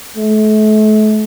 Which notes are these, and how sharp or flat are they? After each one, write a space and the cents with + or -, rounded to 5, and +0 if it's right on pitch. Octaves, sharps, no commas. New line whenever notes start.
A3 -40